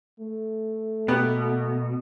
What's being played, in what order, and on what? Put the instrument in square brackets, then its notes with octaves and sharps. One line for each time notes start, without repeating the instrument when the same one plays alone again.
[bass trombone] A3
[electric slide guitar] B2 [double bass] A#3 [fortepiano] B3 G4 F#5